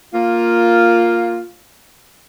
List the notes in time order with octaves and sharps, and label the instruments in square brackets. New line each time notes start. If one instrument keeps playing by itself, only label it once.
[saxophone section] A#3 F4